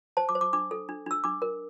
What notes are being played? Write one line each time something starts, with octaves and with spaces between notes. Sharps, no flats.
C5 A5
D6
C5
D6
D4 D6
A4
D4
D4 E6
D4 D6
A#4